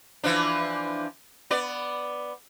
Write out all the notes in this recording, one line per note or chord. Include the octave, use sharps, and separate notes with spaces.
E3 F3 D4
B3 D5